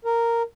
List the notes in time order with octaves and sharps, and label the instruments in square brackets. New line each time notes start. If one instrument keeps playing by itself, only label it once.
[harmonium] A#4